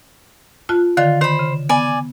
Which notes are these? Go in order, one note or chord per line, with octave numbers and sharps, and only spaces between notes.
F4 A5 F#6
D3 D#3 F4
D#3 C5 B5
C#3
B3 D5 G#5